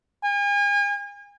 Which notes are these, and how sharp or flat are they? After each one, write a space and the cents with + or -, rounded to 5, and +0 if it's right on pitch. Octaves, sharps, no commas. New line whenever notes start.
G#5 -40